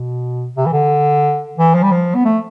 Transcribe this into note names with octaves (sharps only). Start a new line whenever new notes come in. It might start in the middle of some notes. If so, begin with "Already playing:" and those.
Already playing: B2
C3
E3
D3
E3
F3
G3
F3
B3
A3